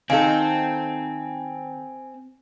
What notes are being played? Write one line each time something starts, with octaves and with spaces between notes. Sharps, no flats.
D#3 C4 D#4 A4 F5 G#5